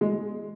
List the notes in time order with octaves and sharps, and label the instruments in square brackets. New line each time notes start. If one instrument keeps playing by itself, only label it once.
[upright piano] G#3